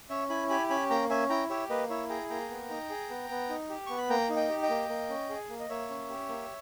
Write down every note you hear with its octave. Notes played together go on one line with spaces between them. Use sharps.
C#4 C#5 E5
E4 G#5 B5
G4 G#5 B5
C#4 G#5 B5
A#3 G5 A#5
C#4 E5 G#5
E4 G5 A#5
G4 C#5 E5
A#3 B4 D#5
E4 C#5 E5
G#4 G5 A#5
A#3 G5 A#5
B3
D#4
G#4
B3
B3
D#4
G4
B3 C#6
B5
A#3 G5 A#5
D#4
D#5 G5
G4
D#5 G5
A#3
A#3
C#4
G#4
A#3
D#5
A#3 C#5 E5
C#4
G4
A#3